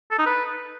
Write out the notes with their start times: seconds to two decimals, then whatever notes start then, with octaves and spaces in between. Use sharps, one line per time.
0.11 A4
0.19 D#4
0.26 B4